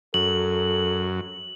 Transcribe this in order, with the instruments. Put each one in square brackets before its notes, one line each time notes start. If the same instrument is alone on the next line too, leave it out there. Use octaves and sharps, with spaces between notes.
[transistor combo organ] F#2 [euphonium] A4 [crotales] F#7